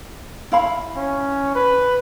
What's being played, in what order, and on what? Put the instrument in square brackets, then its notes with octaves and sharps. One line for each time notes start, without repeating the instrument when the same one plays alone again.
[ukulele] E4 F5 B5
[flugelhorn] C#4
B4